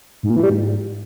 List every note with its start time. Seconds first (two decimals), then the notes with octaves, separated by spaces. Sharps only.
0.23 G#2
0.30 A#2
0.36 E3
0.43 G3
0.50 G#2